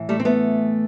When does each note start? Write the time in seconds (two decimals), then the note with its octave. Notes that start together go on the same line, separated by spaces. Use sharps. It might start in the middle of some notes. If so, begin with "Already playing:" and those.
Already playing: A2 E3
0.09 G3 A3
0.20 C4
0.25 A3 B3